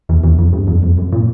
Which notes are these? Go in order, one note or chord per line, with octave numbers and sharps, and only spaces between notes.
E2
E2
F2
G2
F2
F2
F#2
A#2